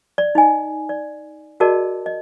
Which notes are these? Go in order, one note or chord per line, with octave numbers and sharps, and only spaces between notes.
D5
D#4 D#5 G#5
D5
F#4 G#4 A#4 D5 D#5 A5
D#5